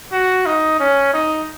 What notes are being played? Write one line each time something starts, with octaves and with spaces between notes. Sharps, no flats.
F#4
D#4
C#4
D#4